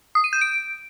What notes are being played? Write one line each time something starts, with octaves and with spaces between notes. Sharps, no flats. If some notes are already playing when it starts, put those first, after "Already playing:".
D#6
D#7
G6
D7